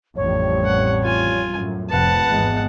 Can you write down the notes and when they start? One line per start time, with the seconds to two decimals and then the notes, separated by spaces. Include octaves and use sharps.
0.16 A1 F2 G3 C#5
0.65 F#5
1.03 F4 G#5
1.49 F#2 A2
1.90 F1 F2 B4 F#5 A5
2.30 G#1 E2 G#3